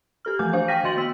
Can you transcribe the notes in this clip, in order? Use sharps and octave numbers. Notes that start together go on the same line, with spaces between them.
G4 A4 F6
E3 F3 A3 G#5 D6 G6
D4 C5 F5 C#6
F5 G5 F6 A#6 B6 D#7
D#3 F#4 D#5 C6 A6 F#7
B3 E6 B6